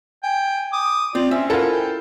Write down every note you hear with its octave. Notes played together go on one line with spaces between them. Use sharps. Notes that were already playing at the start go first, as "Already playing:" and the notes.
G5 G#5
D6 D#6
C4 F4 D5
C4 C#4 E5
E4 F4 A4 A#4 F#5
G5